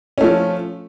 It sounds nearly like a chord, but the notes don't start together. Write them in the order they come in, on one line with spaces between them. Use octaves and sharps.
C#4 A3 F3